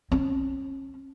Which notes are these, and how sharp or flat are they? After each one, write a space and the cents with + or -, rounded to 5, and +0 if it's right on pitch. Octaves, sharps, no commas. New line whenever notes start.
C#4 -35